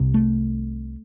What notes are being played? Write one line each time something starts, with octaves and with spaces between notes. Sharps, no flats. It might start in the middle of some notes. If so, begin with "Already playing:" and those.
Already playing: C2 C3
A3